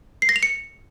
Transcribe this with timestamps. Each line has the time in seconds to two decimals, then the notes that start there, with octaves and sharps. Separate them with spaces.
0.22 C7
0.29 A#6
0.36 F7
0.43 C#7